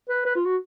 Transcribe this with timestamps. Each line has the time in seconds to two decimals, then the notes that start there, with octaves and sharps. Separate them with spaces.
0.09 B4
0.25 B4
0.35 F4
0.46 F#4